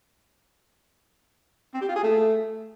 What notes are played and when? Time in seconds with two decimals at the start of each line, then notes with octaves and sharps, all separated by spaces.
1.74 C4
1.81 G4
1.89 F4
1.96 G#4
2.03 A3